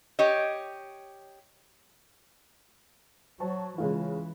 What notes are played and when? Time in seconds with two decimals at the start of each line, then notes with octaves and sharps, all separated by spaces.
0.19 G4 C#5 D#5
3.40 F#3 C5 A5 C#6
3.78 C#3 E3 G#3 F4